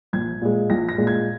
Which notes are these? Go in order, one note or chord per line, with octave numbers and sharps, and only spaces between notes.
A#1 G#6
A#2 G#3
A#1 A#6
A#6
A#2 G#3
G#6